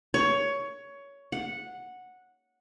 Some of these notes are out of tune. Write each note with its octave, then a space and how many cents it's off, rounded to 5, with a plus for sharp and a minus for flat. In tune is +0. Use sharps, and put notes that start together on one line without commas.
C#5 +15
F#5 -10